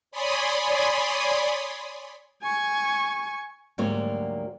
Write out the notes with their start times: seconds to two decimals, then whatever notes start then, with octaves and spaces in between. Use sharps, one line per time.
0.11 C#5 D5 G#5 B5 C6 D#6
2.43 G#5 C#6
3.78 D2 G#2 F#3 G3 A#3 C#5